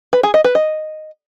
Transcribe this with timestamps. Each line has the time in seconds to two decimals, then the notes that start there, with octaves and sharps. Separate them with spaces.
0.13 B4
0.23 G#4
0.34 D#5
0.44 B4
0.55 D#5